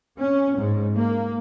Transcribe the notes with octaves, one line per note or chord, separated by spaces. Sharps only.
C#4
G#2
A#3